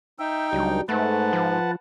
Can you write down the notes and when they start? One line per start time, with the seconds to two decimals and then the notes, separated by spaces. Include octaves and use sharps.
0.19 D#4 E5 G5
0.53 C#2 F#3 G3 D4
0.89 G#2 A3 B4 F#5 A5
1.33 F3